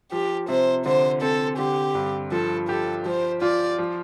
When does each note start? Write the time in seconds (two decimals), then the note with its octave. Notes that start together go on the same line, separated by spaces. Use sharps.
0.12 F3 G4
0.48 C3 C5
0.86 D3 C5
1.22 C4 A4
1.58 D3 G4
1.95 G2
2.32 F3 A4
2.69 G4 A4
3.05 F3 C5
3.42 F4 D5
3.78 F3